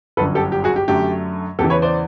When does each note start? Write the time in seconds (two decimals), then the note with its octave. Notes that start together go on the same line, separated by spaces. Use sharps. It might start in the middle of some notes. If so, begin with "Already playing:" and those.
0.17 G1 F#2 D3 A4 B4
0.35 G4 A4
0.52 G4
0.64 F#4 G#4
0.76 G4
0.88 F#2 D3 F#3 A3 G4
1.59 E2 C#3 E3 G4 A4
1.70 B4 C#5
1.82 C5 D5